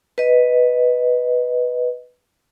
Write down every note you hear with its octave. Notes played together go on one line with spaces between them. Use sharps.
B4 D#5